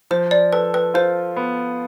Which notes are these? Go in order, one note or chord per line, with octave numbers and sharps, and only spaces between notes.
F3 C5
D5
A4 B4
B4
F4 C5
B3